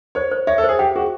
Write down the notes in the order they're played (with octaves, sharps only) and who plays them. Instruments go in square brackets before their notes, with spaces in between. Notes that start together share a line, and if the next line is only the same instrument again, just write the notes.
[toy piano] C5 [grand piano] C#5
[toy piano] C5
[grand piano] C#5 [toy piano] E5
[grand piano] A4
[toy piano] C5
[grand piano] G#4
[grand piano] G4 [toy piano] G5
[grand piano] F#4 [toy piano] G#4